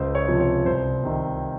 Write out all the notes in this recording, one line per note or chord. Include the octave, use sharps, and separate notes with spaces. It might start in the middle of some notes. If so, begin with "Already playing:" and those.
Already playing: C#2 C5
C#5
C3 F3
C#5
C2 C5
C3 D#3